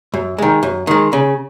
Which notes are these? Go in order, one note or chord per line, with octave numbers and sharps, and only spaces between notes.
F#2
D#3 G#3
F#2
D#3 G#3
C#3